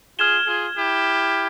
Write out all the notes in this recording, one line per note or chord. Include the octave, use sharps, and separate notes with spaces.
F4 G#4 F6 G#6 E7 G7
F4 G#4
E4 G4